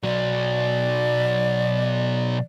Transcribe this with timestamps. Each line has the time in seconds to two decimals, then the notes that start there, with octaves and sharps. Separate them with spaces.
0.04 B2 F#3 D5